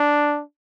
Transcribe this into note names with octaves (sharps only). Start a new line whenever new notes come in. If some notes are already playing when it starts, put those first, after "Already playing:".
Already playing: D4